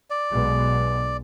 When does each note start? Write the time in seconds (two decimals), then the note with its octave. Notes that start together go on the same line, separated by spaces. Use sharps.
0.10 D5
0.30 B1 B2 G#3